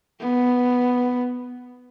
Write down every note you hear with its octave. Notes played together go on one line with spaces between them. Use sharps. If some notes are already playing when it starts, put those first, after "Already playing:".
B3